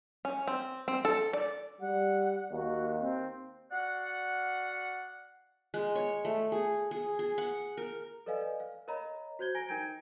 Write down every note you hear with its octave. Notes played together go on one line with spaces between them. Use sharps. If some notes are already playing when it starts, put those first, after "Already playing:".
C#4
C4
C4
A4
D5
G3 F#5
D#2 F#4
C4
F#4 D5 F5 F#5
G#3
C#5
A3
G#4
G#4
G#4
F#5
A#4
A4 B4 D5 D#5 F5 G#5
F5
A#4 C#5 D#5 A#5 B5
F#4 C5 G6 G#6 G7
G#5 A#5 A#6 D7
D#4 A#4 G5 G6 G#6 D7